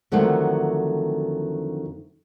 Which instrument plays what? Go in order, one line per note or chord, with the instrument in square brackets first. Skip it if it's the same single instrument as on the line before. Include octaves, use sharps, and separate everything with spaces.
[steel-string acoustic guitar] F2 D3 D#3 F#3 A3